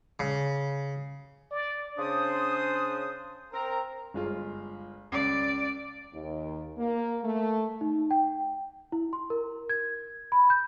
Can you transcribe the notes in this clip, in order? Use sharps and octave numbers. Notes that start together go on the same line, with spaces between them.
C#3
D5
C#3 D4 C5 D#6
C4 A#4 A#5
G1 G#3 F4
C#2 D5
D#2
A#3
A3
D#4
G5
E4
C6
A#4
G#6
B5
G6